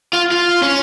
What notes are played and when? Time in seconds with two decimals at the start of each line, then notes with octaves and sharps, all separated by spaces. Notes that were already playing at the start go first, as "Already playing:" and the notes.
0.13 F4
0.31 F4
0.63 C#4